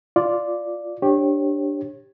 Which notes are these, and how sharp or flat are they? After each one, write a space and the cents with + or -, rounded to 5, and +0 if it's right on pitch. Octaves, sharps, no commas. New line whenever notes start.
F4 +0 D5 +0
D4 +0 G4 +0 C#5 -30